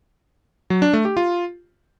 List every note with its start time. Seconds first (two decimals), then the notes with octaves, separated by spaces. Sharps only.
0.70 F#3
0.82 D4
0.93 A3
1.05 G4
1.17 F4